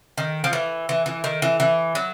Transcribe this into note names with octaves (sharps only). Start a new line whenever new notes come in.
D#3
F3
E3
E3
E3
D#3
E3
E3
F#3